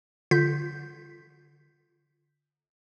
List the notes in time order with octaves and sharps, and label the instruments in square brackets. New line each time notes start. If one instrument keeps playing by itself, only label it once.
[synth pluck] D3 F4 G6 B6